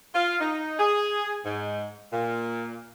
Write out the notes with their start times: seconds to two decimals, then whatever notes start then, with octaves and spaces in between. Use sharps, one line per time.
0.14 F4
0.40 D#4
0.78 G#4
1.45 G#2
2.12 A#2